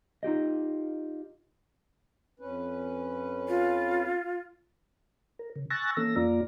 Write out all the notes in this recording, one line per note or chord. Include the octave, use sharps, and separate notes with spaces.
D#4 F4 G4 D#5
F2 C#4 B4
F4
A#4
C#3
G#5 C#6 E6 F#6 A6 A#6
E3 A#3 C#4 A4 E6 A#6
F2 A#3 F4 D5 A#5